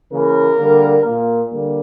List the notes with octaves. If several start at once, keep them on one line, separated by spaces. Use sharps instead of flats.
C#3 E3 A#3 A#4
D3 G3 A#3
A#2 A#3
D3 G3 A#3